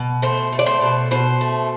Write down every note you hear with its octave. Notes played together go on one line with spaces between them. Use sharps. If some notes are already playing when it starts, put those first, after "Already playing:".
Already playing: B2
A3 C5
A3
D5
C5
B2
B2 C5
A3